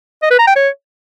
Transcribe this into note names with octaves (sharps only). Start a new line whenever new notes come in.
D#5
B4
A#5
G5
C#5